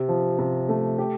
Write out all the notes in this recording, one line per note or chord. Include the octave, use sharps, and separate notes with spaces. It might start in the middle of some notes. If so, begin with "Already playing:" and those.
Already playing: C3
F3
C3
A3
G4